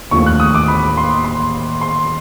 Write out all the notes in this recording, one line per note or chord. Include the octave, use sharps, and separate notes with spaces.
D#2 D3 F3 A3 C#6
F#6
D#6
D6
B5
C6
C6
C6